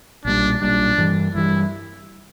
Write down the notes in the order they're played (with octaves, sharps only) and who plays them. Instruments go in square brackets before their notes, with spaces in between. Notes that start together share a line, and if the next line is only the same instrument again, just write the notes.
[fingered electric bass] B1 A#2 G3 [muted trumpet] D4
[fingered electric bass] B1 A#2 G3 [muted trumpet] D4
[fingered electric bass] G2 E3 G3
[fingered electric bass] G2 E3 G3 [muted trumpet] E4